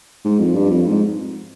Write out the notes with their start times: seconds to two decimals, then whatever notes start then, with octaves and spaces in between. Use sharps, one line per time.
0.24 G#2
0.39 F2
0.55 G2
0.70 F2
0.86 G#2